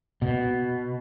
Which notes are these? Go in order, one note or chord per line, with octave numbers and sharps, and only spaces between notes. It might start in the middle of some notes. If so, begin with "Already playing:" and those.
B2